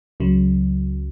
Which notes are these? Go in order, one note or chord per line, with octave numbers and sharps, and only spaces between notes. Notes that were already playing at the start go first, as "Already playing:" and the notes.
C#2 C#3 F#3